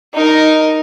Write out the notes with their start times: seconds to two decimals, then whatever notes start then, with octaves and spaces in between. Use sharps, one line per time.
0.14 D#4 A#4